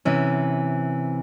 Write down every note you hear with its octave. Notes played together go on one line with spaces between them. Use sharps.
C3 E3 C#4